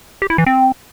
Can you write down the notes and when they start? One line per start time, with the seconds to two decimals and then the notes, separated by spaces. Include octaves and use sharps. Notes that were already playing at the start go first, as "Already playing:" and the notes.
0.22 G4
0.30 E4
0.38 E3
0.46 C4